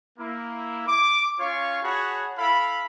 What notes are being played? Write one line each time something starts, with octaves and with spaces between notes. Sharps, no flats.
A#3 E4
D6
C#4 F4 C#5 F5 C#6
F#4 G#4 C#5 F#5 A5 B5
E4 A4 F5 B5